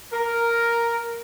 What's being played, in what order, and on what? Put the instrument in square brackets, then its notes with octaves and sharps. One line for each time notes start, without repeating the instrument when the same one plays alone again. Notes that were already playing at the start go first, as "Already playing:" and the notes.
[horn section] A#4